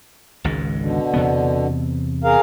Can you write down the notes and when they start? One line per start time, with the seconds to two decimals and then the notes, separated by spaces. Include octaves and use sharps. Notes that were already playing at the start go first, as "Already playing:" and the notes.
0.44 G#1 C#2 G#2
0.78 B2 D3
1.14 E2 C3 B3
2.24 G#4 A#4 F5